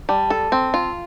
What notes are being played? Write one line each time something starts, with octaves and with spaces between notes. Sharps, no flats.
G3 A5
A4
C4
F4